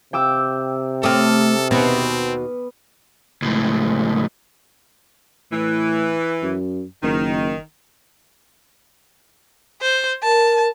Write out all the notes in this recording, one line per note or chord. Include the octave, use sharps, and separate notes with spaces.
C3 G5 D6 E6
A3 C4 A4 D6 D#6 F6
D#2 B2 B3 C4
C#2 A2
A2 E3
F#2
F#1 D#3
C5
A#4 A5